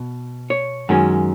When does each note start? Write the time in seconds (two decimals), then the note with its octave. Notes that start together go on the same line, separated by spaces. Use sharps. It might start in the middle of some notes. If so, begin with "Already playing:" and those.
Already playing: B2
0.50 C#5
0.89 F#2 D#3 G#3 C#4